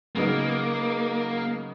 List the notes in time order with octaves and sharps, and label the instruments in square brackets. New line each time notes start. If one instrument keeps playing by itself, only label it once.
[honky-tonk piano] C#3 F#3 B3 D#4 [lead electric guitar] A#3